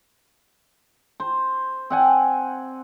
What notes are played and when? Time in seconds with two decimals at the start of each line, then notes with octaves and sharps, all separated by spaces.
1.20 C5
1.90 C4 F#5 G#5